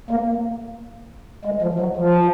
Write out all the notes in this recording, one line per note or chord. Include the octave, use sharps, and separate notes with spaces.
A#3
G#3
F3
F#3
F3